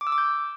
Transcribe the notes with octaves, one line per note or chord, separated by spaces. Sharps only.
D6
E6
D6
G6